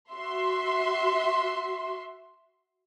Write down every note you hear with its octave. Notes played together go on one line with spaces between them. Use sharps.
F#4 E5 C6